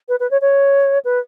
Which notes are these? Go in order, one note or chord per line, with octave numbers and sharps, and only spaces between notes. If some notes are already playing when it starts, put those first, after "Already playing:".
B4
B4
C#5
C#5
B4